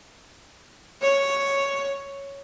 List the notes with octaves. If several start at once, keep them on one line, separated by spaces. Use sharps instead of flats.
C#5